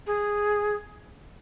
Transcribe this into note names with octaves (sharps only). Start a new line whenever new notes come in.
G#4